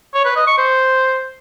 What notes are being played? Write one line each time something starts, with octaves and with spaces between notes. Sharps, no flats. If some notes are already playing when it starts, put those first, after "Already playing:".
C#5
B4
D#5
C#6
C5